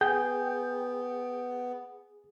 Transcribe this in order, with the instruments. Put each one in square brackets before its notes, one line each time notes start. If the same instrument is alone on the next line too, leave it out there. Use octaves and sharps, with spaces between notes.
[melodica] B3 [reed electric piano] G#4 [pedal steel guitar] G5